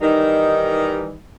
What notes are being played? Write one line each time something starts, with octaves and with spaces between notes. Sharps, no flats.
D#3 E3 G3 D#4